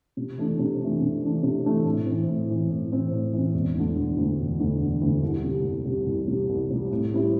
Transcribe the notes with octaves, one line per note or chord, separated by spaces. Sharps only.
C3
E3 A3 D4
C3
E3 A3 D4
C3
E3 A3 D4
C3
E3 A3 D4
A2
E3 C4
A2
E3 C4
A2
E3 C4
A2
E3 C4
E1
D2 D3
E1
D2 D3
E1
D2 D3
E1
D2 D3
C2
C3 G3
C2
C3 G3
C2
C3 G3
C2
C3 G3
A2
G3 C4 E4